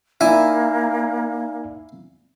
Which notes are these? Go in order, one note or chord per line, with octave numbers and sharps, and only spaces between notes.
A#3 D#4 E4 D5 G#5